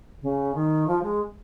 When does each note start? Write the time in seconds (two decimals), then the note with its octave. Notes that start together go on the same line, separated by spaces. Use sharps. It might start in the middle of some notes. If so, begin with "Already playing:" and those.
0.22 C#3
0.55 D#3
0.87 F3
1.03 G#3